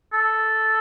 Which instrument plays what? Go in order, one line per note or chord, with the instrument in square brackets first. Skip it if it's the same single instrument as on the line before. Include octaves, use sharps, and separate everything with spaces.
[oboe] A4